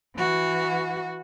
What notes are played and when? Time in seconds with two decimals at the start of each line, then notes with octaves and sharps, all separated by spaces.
0.16 E3 F#4